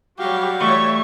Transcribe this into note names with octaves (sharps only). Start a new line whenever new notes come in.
F#3 G3 F#4 G4 F5
E3 G3 A3 C#5 E5 C#6